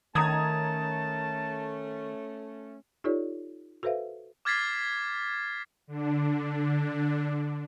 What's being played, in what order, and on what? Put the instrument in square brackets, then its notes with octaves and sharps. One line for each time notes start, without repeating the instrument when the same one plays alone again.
[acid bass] D#3 [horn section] A3 C#4 [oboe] A5 [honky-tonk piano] A#5 D#6 G#6
[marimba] D#4 F4 G4 A4 C#5 D5
F#4 A4 B4 C5 E5 F5
[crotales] D6 F6 G#6 A6 B6 C7
[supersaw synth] D3 D4